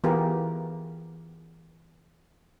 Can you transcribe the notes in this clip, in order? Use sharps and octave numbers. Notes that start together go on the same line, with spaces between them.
E3 B3 F4 G4 G#4 A#4